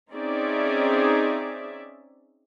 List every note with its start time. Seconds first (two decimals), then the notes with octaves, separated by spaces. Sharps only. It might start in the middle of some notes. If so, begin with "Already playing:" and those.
0.12 C4 C#4 D#4 G#4 D5 E5